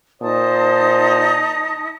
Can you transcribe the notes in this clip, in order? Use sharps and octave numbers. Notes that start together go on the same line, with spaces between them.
A#2 D#4 C5 A5 D#6